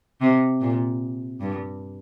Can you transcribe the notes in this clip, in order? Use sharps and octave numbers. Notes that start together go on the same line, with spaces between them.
C3
A#2
G2